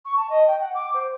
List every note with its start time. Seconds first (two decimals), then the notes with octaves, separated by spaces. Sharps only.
0.05 C#6
0.16 A5
0.29 D#5
0.47 G5
0.61 F#5
0.74 D6
0.94 C5